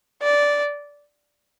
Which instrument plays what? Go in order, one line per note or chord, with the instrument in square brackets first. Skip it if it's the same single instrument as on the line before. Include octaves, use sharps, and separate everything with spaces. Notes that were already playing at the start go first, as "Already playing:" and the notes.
[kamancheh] D5